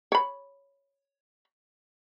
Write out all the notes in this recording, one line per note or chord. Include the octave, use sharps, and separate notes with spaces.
C#5 B5